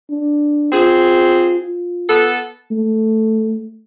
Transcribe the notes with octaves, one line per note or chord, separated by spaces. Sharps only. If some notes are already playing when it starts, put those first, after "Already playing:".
D4
C4 F4 G#4
F4
B3 A4
A3